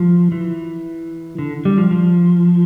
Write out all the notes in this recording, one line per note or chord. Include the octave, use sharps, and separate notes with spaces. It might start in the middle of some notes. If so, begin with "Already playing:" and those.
Already playing: F3
E3
D3
G3
F3
F3